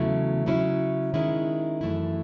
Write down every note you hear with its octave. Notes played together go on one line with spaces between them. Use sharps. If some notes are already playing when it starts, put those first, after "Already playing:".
Already playing: E2 C#3 F#3 A3 E4
C#3 F#3 C#4 E4
D#3 G#3 C#4 E4
F#2 E3 A3 E4